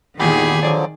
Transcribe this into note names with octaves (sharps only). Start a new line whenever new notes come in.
G#1 E2 A#2 D#3 G4 G#4 B5
D3 F3 F#3 D5